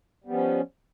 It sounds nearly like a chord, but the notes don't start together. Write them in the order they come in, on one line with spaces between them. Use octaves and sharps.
G3 B3 F3 C#4